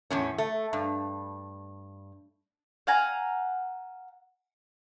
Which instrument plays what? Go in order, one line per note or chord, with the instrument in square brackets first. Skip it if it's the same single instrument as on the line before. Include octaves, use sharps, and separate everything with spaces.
[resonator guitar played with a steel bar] E2 A2 C#4
A3
G2
[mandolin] F5 F#5 G#5 A#5